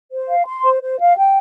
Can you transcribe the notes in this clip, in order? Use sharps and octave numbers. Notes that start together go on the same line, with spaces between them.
C5
F5
C6
C5
C5
F5
G5